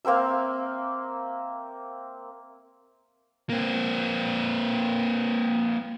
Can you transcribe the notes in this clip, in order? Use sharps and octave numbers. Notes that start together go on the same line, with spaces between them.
A#3 C4 A#4 E5
A#3 C4